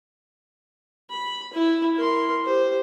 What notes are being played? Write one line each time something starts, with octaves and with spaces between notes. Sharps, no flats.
B5
E4
A#4 C6
G4 C5